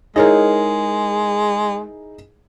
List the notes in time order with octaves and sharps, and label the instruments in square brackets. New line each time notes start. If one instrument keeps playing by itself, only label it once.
[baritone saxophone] G#3 [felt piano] D#4 E4 G#4 [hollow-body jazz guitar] A#4 C#5 D#5